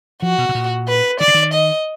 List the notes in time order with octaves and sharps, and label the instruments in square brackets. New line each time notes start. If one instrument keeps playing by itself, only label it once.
[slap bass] F3 [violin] F#4
[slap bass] B2
B2
A#2
[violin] B4
[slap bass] D#3 [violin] D5
[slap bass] D3
D#3
[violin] D#5